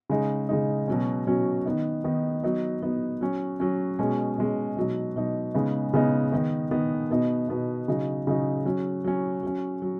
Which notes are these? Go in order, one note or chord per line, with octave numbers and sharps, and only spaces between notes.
C#3 G#3 D#4
C#3 G#3 D#4
B2 F#3 C#4
B2 F#3 C#4
D#3 B3 D#4
D#3 B3 D#4
F#3 B3 D#4
F#3 B3 D#4
F#3 C#4
F#3 C#4
B2 G#3 C#4
B2 G#3 C#4
B2 F#3 D#4
B2 F#3 D#4
C#3 G#3 B3 D#4
C#3 G#3 B3 D#4
D#3 B3 D#4
D#3 B3 D#4
B2 B3 D#4
B2 B3 D#4
C#3 F#3 D#4
C#3 F#3 D#4
F#3 C#4
F#3 C#4
F#3 C#4
F#3